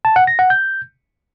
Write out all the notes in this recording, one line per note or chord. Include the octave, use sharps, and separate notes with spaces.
A5
F#5
A#6
F#5
G6